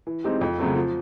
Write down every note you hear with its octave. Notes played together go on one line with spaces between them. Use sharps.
E3
G#3 C4 D#4 G4
F2
C#3 F#3 A3 C4
F3